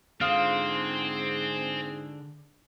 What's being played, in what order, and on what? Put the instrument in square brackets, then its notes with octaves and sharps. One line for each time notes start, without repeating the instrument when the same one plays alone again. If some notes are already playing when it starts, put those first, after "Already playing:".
[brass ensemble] G#2 G#4 [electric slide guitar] D3 [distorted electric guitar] C4 [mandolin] F4 D#6